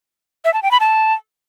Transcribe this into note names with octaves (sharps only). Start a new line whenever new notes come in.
E5
A5
G5
B5
A5